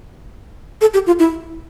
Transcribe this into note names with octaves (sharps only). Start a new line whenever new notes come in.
A4
G4
F4
E4